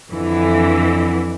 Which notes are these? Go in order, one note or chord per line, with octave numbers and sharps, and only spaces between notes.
F2 D3 E3